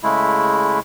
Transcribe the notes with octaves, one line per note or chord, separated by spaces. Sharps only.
C#3 G#3 A3 E4